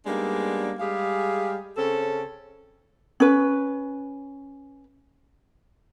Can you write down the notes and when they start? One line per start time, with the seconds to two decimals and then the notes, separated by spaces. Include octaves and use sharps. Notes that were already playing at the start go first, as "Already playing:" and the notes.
0.06 G3 G#3 A#3 B3 D4 D#4
0.80 G3 G#3 G4 G#4 F5
1.77 C#3 C4 C#4 A4
3.20 C#4 B4